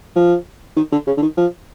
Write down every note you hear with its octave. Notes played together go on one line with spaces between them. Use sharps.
F3
D#3
D3
C#3
D3
D#3
F3